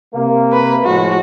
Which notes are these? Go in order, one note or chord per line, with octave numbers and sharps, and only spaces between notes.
C3 A#3
B4
A2 F3 G#3 F#4